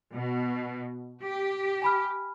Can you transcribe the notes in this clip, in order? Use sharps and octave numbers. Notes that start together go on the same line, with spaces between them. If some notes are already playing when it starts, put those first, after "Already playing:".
B2
G4
G#5 B5 F6